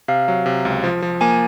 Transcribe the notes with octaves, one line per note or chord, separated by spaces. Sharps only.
C3 F5
F#3
C3
C#2
F3
F3
A#3 G#5